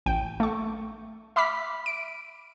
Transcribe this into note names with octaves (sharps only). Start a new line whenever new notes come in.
A1 G5
A3 C#6
E5 B5 D6 F6 B6
D7